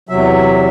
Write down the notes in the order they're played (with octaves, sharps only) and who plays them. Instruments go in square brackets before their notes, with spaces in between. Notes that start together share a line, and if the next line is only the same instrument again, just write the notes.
[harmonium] E2 C3 F#3 E5